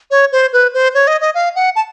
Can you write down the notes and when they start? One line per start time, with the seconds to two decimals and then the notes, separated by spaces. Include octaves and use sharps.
0.11 C#5
0.32 C5
0.53 B4
0.74 C5
0.94 C#5
1.07 D#5
1.21 D#5
1.35 F5
1.55 F#5
1.76 A5